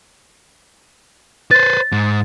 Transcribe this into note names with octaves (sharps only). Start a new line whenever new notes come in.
B4 C5 A6
G#2